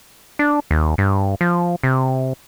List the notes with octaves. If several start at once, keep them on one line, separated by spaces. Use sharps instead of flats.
D4
D#2
G2
F3
C3